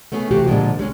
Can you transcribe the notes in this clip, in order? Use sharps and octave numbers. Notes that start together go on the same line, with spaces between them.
A3 B3 C#4 G#4
C3 E3 A3 C4 F#4 G4
A#2 D3 F3 G#3
G3 G#3 C#4